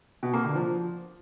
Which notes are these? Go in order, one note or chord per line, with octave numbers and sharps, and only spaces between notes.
B2
A#3
D3
F3